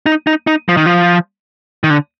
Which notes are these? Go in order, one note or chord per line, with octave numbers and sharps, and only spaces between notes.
D#4
D#4
D#4
F3
D#3
F3
D#3
D3